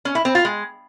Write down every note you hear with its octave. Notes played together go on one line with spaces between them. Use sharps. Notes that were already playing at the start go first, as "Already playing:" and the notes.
C#4
E4
C4
F4
G#3